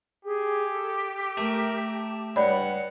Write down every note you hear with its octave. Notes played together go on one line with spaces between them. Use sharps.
G4 G#4
A4
A3 A#4
A5
G2 C#5 D5 F#5 B5